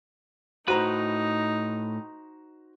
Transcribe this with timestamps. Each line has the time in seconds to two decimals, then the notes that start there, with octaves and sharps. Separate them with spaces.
0.68 A2 D#4 F#4 B4 C5 A#5